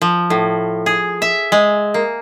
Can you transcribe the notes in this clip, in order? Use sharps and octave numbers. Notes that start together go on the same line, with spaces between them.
F3
A2
G#4
E5
G#3
A#3